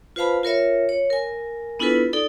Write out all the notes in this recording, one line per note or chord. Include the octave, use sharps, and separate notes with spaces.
F4 B4 C5 F5 A5 B5
F4 A#4 C#5 E5
C#5
A#4 G#5
B3 D4 E4 F4 A4 B4
D#4 A4 D5